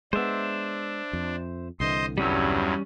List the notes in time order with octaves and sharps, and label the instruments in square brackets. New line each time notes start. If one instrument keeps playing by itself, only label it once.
[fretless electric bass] G#3 B3 [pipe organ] D4 [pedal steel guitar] C5 E5
[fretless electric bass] F2
[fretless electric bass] C2 D3 E3 [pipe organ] C5 D#5 C6
[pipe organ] E2 G2 F#3 [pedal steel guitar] G3 C#4 E6